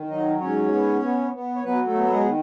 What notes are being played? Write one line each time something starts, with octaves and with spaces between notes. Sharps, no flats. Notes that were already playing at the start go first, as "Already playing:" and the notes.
Already playing: D#3
F#3 D#4 D#5
G#2 C#4 C#5
B3
B3
B3
C#5
F#3 B3 B4
A3 A4
B3
A4
G#3 G#4
D#3